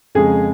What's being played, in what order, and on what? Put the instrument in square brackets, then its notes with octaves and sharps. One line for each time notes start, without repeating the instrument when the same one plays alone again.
[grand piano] F2 C#3 G#3 G#4